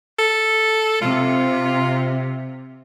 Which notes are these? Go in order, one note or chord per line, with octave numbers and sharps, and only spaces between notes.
A4
C3 F4